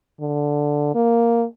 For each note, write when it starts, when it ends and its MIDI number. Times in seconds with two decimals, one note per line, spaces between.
0.21 0.94 50
0.95 1.45 58